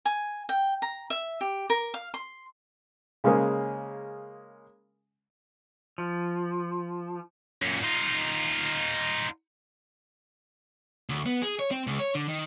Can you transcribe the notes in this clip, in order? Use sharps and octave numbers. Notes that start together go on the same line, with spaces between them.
G#5
G5
A#5
E5
G4
A#4
F5
C6
C#3 G#3 A#3 C#4 G#4 C5
F3
F#2 A#2
D#4 F4
D2
B3
G#4
C#5
C4
C#2
C#5
D3
D#3